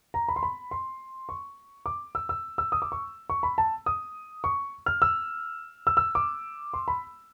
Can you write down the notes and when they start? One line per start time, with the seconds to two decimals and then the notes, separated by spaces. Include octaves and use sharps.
0.14 A#5
0.28 B5
0.36 C6
0.43 B5
0.71 C6
1.29 C#6
1.86 D6
2.15 E6
2.29 E6
2.58 E6
2.72 D#6
2.82 D6
2.92 C#6
3.30 C#6
3.43 B5
3.58 A5
3.86 D#6
4.44 C#6
4.86 F6
5.02 E6
5.87 E6
5.97 E6
6.15 D6
6.74 C6
6.88 B5